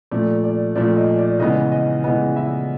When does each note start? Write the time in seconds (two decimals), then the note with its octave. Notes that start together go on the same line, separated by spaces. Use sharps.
0.11 A#2 F3 A3 D5
0.44 D5
0.75 A#2 F3 A3 D5
0.97 D#5
1.19 D5
1.39 C#3 E3 G#3 B3 D#5
1.72 D#5
2.04 C#3 E3 G#3 B3 D#5
2.36 E4 E5